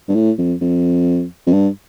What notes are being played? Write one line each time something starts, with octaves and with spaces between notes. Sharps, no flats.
G2
A2
F2
F2
F2
G2